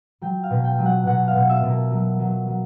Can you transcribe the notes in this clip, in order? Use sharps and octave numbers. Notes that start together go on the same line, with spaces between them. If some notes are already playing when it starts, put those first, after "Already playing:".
F#3 G5
F5
B2
G5
F#3
F#5
B2 F#5
F5
B2
E5
B2
A#4
F#3
F#3
F#3